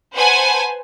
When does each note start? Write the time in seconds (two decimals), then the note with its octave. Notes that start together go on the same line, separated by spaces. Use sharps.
0.15 B4 C5 F#5 G#5 A5